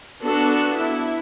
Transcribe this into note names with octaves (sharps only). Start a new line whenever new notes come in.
B3 D4 F#4 A4
E4